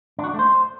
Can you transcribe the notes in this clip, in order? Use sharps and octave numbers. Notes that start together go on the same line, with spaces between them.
D4
F#4
D4
A3
C5